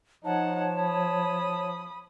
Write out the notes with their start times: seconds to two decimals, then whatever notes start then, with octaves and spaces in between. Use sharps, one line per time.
0.24 F3 D#4 C#5 F#5 A5
0.80 B5 D#6